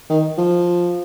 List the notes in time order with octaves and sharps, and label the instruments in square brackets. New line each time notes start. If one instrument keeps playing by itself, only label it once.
[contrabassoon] D#3
F3